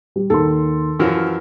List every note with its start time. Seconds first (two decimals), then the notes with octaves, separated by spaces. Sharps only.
0.16 G3
0.30 D#2 A4 C6
0.99 F#2 E3 F3 F6 A#6